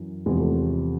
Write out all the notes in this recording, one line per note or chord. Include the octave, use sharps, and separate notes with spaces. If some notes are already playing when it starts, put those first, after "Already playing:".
Already playing: F#2 E3
E2 C3 F3 G#3
A3